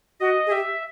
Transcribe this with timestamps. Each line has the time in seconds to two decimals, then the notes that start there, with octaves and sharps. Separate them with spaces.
0.20 F#4 D#5
0.47 G#4
0.51 G4 E5